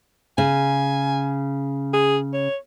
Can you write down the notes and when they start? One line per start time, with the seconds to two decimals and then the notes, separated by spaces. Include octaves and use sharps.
0.38 C#3 G#5
1.93 G#4
2.33 C#5